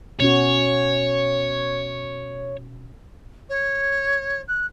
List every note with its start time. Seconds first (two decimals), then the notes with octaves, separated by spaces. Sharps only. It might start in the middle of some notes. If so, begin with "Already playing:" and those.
0.20 B2 C#4 F#4 C#5
3.49 C#5
4.48 F#6